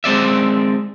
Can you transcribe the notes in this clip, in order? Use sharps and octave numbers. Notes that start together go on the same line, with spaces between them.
G#3 C4 D5 E5